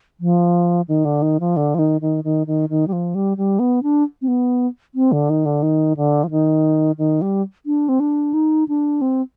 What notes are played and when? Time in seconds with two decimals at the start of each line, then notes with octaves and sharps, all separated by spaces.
0.20 F3
0.88 D#3
1.05 D3
1.22 D#3
1.40 F3
1.56 D3
1.74 F3
1.79 D#3
2.01 D#3
2.24 D#3
2.47 D#3
2.69 D#3
2.87 G3
2.92 F3
3.15 G3
3.37 G3
3.59 B3
3.83 D4
4.22 C4
4.28 B3
4.95 C4
5.12 D3
5.30 D#3
5.45 D3
5.62 D#3
5.97 D3
6.24 F3
6.30 D#3
6.98 D#3
7.21 G3
7.66 D4
7.89 C4
8.00 D4
8.33 D#4
8.68 D4
9.01 C4